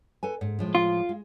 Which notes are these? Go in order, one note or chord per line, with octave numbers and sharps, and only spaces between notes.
A4 B4 G#5
G#2
A2 F3 G#3
F4
G#3